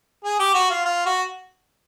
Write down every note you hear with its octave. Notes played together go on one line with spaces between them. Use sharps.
G#4
G4
F#4
F4
F4
F#4